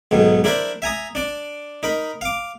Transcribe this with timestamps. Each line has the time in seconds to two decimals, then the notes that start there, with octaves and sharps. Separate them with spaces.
0.11 B1 G#2 D#3
0.44 D4 E4 A#4 C5 D5
0.82 E5 G#5 A#5 D#6
1.15 D4 D5
1.83 D#4 A#4 B5
2.21 F5 D6